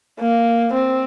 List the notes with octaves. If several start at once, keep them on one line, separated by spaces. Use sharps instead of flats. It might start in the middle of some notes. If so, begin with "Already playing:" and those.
A#3
C4